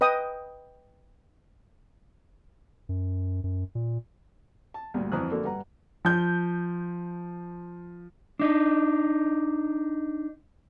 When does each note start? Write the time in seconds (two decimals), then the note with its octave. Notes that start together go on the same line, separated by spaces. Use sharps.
0.01 B4 D#5 G5 D#6
2.89 F#2
3.44 F#2
3.75 A#2
4.74 A5
4.94 D2 G2 A#2
5.12 F2 E3 C5 A#5 D#6 F#6
5.31 D3 A3 A#3 F#4 A4
5.44 G2 B4 F#5 A#5
6.05 F3 G6
8.39 D4 D#4